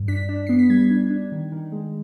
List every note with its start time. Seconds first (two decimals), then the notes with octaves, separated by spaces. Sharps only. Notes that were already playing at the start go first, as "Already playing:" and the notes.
Already playing: G2
0.08 D4 B6
0.29 D4
0.47 B3 C7
0.59 B6
0.70 G3 G#6
0.91 D4
1.10 D4
1.32 D#3
1.52 D#3
1.72 G#3